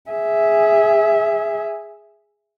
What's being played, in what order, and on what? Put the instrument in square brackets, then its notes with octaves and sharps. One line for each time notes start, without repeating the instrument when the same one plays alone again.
[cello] G#4 E5